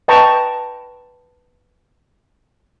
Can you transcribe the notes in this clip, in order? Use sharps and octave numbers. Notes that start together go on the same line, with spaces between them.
B4 D#5 G5 A5 A#5 C#6